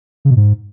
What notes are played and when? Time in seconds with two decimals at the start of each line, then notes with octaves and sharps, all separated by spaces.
0.25 C#3
0.31 B2
0.36 G#2